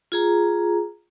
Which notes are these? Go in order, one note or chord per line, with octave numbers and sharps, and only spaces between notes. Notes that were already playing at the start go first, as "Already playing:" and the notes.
F4 G#4 A#5